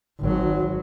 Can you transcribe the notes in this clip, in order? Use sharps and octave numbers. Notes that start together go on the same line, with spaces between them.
G#1 F#3